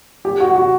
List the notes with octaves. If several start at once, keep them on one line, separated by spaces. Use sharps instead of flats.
G4
F#4
F#4